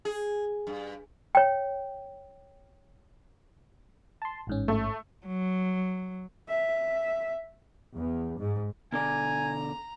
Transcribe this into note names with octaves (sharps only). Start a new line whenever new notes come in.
G#4
G2
C#5 G5
A5 C6
A1 G#2 C#4
A3
F#3
E5
E2
G#2
B2 D3 D5 G#5 A#5